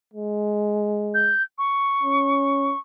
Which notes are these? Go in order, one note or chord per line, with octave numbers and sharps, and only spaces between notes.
G#3
G6
C#6
C#4